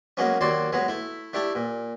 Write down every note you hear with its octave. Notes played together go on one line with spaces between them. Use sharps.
F#3 G#3 A#3 B3 C#4
D#2 F#3 F#4 D5 C6
F#3 G#3 B3
A3 E4
A3 D4 E4 G4
A#2